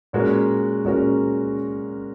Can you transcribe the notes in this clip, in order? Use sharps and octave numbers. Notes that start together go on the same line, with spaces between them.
A#2 G#3 C#4 F#4 A#4
A#2 G#3 C#4 F#4 A#4